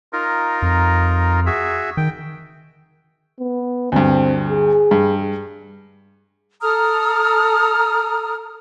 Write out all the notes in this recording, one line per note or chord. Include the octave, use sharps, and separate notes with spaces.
D#4 F4 A#4
F2
F#4 G#4 E5
D#3 G5
B3
D2 G2 C4
G#4
G2
A4 A#5 D#6 F6